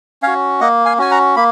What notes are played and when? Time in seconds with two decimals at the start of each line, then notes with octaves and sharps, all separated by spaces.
0.22 C#4 F#4 C#5 F5
0.61 A#3 D#5 F#5
0.85 F5 G#5
0.98 C#4 F#4 G#5
1.11 F#5 A#5
1.36 A#3 B5